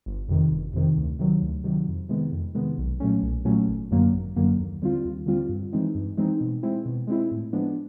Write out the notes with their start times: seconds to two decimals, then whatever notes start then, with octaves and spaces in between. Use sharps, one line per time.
0.06 G1
0.28 F2 C3 D#3
0.52 G1
0.73 F2 C3 D#3
0.97 D2
1.19 C3 D#3 F#3
1.42 D2
1.64 C3 D#3 F#3
1.87 F2
2.09 C3 D#3 G#3 B3
2.33 F2
2.55 C3 D#3 G#3 B3
2.78 B1
3.00 A#2 F#3 A3 C#4
3.23 B1
3.45 A#2 F#3 A3 C#4
3.68 G#1
3.91 F#2 D3 F#3 A#3
4.13 G#1
4.36 F#2 D3 F#3 A#3
4.58 D#2
4.82 D3 G3 C4 F4
5.05 D#2
5.26 D3 G3 C4 F4
5.49 G2
5.73 E3 G#3 C4 D#4
5.95 G2
6.17 E3 G#3 C4 D#4
6.41 B2
6.63 G#3 C4 E4
6.85 B2
7.07 G#3 C4 E4
7.31 A2
7.53 F3 G#3 B3 D4